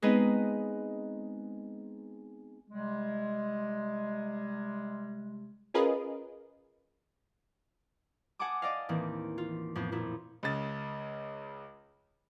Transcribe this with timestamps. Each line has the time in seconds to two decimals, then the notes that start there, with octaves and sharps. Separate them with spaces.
0.02 G#3 B3 C4 D#4 B4 D#5
2.68 C3 G3 G#3
5.74 C#4 F4 G#4 A#4 B4 D#5
8.39 F#5 G#5 A5 D6 D#6
8.62 D5 D#5 F5
8.89 D#2 A2 E3 A#3 C4
9.38 F4
9.75 F2 A2 B3 C5
9.92 F2 A#2 E4
10.43 C#2 C#3 A6